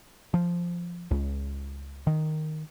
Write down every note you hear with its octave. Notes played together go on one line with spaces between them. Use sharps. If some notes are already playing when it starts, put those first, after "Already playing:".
F3
C#2
D#3